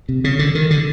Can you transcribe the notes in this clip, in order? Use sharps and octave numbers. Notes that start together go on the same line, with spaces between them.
C3
C#3
D3
D#3
D3